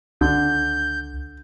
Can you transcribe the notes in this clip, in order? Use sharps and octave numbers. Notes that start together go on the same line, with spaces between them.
C#2 D3 G6